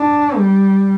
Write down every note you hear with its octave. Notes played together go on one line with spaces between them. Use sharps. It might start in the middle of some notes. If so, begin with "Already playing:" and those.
Already playing: D4
G3